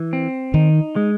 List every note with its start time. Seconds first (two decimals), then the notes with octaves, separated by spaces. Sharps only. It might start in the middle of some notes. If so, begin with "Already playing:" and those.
Already playing: E3
0.13 C4
0.54 D#3 D#4
0.96 G#3